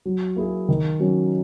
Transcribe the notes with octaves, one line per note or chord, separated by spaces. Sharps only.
F#3
A#3 E4 G#4
D#3
F#3 C#4